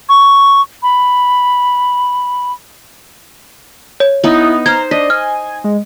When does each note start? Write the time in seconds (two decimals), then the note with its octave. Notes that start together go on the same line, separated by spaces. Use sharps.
0.09 C#6
0.83 B5
4.00 C#5
4.24 B3 D#4 E4
4.66 C5 A#5 F6 G#6
4.91 D4 D#5 B6
5.10 G#5 F6
5.64 G#3